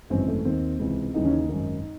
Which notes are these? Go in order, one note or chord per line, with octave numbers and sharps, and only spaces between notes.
G#1 F#2 C#3 E3 C4
A3
D#2 D#3 C4
C#2 C3 E3
D#2 C#3 E3 D#4
C#4
D#4
G#1 F#2 D#3